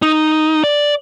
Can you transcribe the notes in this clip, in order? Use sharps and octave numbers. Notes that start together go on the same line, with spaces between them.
D#4
D5